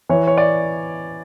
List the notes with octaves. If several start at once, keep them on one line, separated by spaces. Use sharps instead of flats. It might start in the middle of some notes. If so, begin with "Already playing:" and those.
E3 C#5
C#5
D5